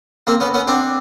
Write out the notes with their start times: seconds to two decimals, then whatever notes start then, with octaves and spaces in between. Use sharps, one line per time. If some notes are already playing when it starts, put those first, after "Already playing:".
0.27 A#3 C4
0.40 B3 C#4
0.54 B3 C#4
0.67 C4 D4